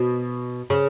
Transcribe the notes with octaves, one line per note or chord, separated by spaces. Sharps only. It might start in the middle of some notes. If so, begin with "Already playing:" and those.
Already playing: B2
C#3